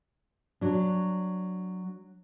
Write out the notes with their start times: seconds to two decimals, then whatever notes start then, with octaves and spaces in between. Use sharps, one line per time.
0.61 F#3 D4